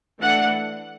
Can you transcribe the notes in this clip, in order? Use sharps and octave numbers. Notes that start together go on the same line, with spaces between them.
E3 A3 D4 F#5